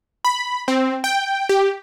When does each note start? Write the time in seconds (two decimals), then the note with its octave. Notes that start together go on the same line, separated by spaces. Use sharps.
0.25 B5
0.68 C4
1.04 G5
1.49 G4